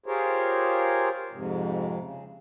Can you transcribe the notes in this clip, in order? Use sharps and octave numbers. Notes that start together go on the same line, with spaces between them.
F4 G4 G#4 A#4 C5 C#5
F2 G#2 C3
C#3